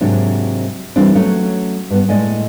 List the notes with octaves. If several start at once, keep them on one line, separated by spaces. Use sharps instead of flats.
G#2 C3 F#3 A#3 D4
E3 G3 A#3 C4 D4
F#3 A3 C#4
G2 B3
A2 G#3 D5 D#5 G#5